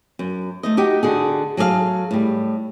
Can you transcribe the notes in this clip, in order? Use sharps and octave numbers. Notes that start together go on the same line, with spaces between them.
F#2
A3 D#4 D#5
D#4 F#4 G4
D3 F#4 G#4
F#3 G#4 A4 C#5 F5
A2 G3